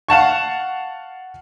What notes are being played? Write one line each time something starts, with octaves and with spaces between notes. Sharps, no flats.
F5 F#5 A5 C#6